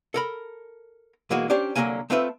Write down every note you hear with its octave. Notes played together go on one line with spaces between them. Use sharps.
A4 A#4 B5
B1 E3 G#3 A#3 F#4
C#4 D4 G4 C5 D5
C2 D3 E3 F#3 A#3 G#5
A3 C4 F4 B4 D5 E5